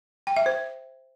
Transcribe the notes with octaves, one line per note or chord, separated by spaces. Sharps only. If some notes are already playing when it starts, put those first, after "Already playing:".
G5
E5
C5